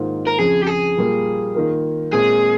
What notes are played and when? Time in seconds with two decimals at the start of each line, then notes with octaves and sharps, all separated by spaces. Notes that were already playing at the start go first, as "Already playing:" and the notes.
Already playing: G#2 D#3 A#3 F4 C5
0.27 A#4
0.39 F2 C#3 F3 G#4
0.62 G4
0.67 G#4
0.97 A#2 G3 A#3 F4
1.55 D#3 A#3 F4 A#4
2.13 A#2 G#3 C4 G#4